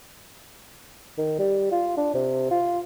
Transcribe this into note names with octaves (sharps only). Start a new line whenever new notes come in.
D#3
G3
F4
D4
C3
F4